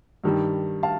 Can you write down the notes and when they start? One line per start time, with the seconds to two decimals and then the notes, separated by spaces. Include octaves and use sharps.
0.24 G2 D#3 G3
0.83 F5 A5